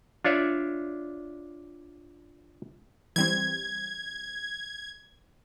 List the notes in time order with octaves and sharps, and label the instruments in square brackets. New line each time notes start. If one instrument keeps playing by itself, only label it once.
[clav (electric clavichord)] D4 F4 C#5 D5 E5
[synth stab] E3 G3 C4 [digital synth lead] G#6